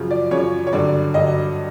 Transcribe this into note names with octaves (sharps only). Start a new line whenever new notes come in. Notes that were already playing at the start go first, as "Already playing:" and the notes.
Already playing: F#2 C#3 F3
D5
F#2 C#3 F3 C#5
C#5
G2 D3 F#3 D5
G2 D3 F#3 D#5